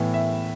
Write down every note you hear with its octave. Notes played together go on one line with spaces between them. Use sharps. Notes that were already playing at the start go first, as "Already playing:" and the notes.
Already playing: A2 E3 B3
E5